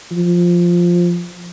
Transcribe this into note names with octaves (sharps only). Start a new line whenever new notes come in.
F3